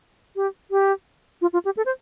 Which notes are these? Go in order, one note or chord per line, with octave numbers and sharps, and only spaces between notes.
G4
G4
F4
F4
G4
A4
C5